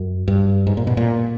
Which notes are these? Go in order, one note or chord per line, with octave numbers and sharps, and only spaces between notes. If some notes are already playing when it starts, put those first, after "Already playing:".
Already playing: F#2
G2
G#2
A#2
B2
A#2